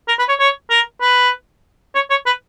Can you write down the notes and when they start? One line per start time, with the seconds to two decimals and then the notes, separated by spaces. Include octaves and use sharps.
0.08 A#4
0.19 B4
0.29 C#5
0.39 C#5
0.70 A#4
1.01 B4
1.95 C#5
2.10 C#5
2.26 B4